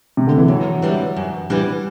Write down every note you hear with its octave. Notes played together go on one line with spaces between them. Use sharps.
C3
D3
E3
F#2 F#3
E3 G3 D4
F#2
E3 G3 D4